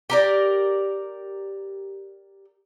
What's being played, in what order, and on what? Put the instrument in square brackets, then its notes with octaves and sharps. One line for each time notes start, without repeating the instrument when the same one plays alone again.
[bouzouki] G4 A#4 D5